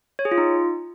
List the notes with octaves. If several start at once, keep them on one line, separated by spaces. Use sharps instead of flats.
C#5
G#4
F4
D#4